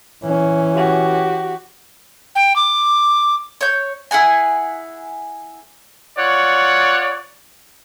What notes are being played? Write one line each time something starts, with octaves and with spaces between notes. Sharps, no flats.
E3 C#4
F#4 G4
G5
D6
C#5 G6
E4 G#4 F#5 G#5
F4 C#5 D5 F#5